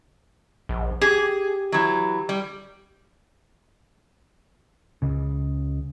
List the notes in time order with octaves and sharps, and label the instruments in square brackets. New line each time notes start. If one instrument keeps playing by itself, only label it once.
[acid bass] A#1
[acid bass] G4 [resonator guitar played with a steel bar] G#4
[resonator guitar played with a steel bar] E3 F#3
G3
[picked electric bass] C#2 C#3